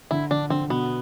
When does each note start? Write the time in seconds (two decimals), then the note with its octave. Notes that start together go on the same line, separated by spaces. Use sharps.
0.11 D3 E4
0.31 D3 D4
0.50 D3 C4
0.70 B2 B3